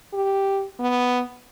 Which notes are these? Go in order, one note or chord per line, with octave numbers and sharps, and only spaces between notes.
G4
B3